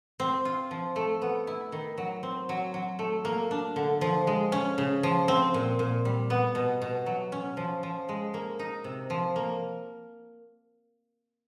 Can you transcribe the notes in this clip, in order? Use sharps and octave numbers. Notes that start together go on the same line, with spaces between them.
C4
F4
F3
A3
B3
E4
D#3
F#3
C4
F#3
F#3
A3
A#3
D4
D3
F3
G#3
C#4
C#3
F3
C4
A#2
A#2
G3
B3
B2
B2
F#3
C#4
F3
F3
G#3
A#3
D#4
C3
F3
A#3